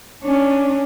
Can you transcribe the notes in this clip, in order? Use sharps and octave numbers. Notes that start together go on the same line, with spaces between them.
C#4 D4